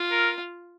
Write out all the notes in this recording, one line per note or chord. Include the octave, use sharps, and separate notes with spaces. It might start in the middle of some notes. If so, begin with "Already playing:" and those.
Already playing: F4
A#4